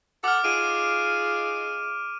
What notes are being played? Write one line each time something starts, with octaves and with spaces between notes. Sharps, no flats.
A4 F#5 D6 F6
D#4 F4 G#4 D7 D#7